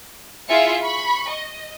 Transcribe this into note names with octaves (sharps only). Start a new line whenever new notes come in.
E4 F4 G#4 E5 F5 C#7
B5 C#6
D#5